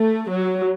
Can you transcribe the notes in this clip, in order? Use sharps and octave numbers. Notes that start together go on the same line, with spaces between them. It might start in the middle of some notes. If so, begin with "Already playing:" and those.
Already playing: A3
F#3